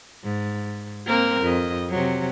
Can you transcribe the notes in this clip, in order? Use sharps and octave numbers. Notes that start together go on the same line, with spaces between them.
G#2
A#3 C4 A#4
F2 D#5
C3 F#3